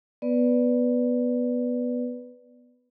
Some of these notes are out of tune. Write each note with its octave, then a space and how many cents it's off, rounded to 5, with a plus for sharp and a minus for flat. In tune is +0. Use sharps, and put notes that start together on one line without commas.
B3 +0 B4 +0 D5 +0